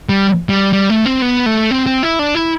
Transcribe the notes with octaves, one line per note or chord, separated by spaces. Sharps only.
G3
G3
G3
A3
C4
B3
A3
C4
C4
E4
D4
E4